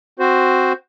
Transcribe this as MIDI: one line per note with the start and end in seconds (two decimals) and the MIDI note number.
0.19 0.73 60
0.19 0.73 66
0.19 0.73 72